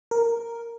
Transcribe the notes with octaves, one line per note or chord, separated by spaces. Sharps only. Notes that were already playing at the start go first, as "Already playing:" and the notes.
A#4